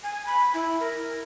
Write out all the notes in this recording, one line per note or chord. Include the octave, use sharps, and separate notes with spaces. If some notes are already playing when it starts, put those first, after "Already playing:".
G#5
B5
E4
A#4